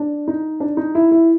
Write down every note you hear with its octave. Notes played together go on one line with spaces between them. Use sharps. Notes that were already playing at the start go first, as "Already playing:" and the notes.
Already playing: D4
D#4
D4
D#4
E4
E4